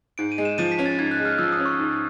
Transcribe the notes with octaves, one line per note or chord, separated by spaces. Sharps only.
G#2 D7
D#7
G#3
E7
F3 D#7
B6
C#4
A6
G#2 G#6
F#6
G#3
F6
F3 E6
D#6
C#4
C#6
G#2